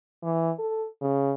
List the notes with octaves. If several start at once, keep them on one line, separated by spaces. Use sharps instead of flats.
E3
A4
C#3